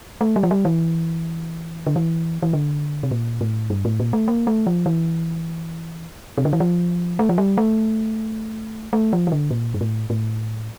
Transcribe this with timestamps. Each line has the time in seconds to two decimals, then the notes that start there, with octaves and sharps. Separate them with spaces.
0.21 A3
0.36 G3
0.43 F3
0.51 G3
0.65 E3
1.87 D3
1.96 E3
2.42 E3
2.53 D3
3.03 C3
3.11 A#2
3.41 A2
3.70 G2
3.85 A2
4.00 A#2
4.13 A3
4.28 A#3
4.47 A3
4.67 F3
4.86 E3
6.38 C3
6.45 D3
6.53 E3
6.60 F3
7.19 A3
7.29 F3
7.38 G3
7.58 A3
8.93 A3
9.13 F3
9.27 E3
9.32 D3
9.51 A#2
9.74 G2
9.81 A2
10.10 A2